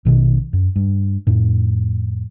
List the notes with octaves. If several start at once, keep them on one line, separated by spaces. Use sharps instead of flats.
A#1 B2 D#3
F#2
G2
F2 A2